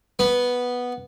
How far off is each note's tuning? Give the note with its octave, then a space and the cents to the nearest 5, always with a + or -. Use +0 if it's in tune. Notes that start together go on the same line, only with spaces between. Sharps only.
B3 -5